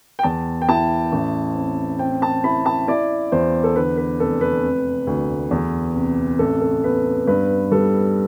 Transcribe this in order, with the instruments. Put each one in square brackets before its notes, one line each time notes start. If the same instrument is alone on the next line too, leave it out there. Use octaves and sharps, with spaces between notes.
[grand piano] G5
E2 A5
G5
E4 A5
A1
C4
C4 G5
A5
E4 B5
A5
E4 D5
E2 C5
A4
D3 B4
B4
F1 A4
B4
C3
D2
E2
C3
A1 A4
A4
B3 B4
G2 B4
G3 A4